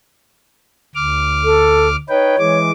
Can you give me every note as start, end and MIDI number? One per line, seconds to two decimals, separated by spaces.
0.95 1.96 38
0.95 1.96 86
0.95 1.96 89
1.44 1.88 69
2.09 2.35 63
2.09 2.35 71
2.09 2.59 73
2.09 2.35 79
2.39 2.71 52
2.39 2.71 56
2.39 2.71 86